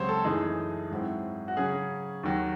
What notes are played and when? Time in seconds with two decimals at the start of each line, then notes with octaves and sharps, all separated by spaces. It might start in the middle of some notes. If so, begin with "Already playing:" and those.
Already playing: C#2 C3 F#3 C5 C#5
0.09 A4
0.24 F#2 E3 A3 D#4 G#4
0.91 G#2 F#3 C4 E4
1.48 F#4
1.57 C#3 F#3 C#4 G#4
2.23 D#2 D#3 F#3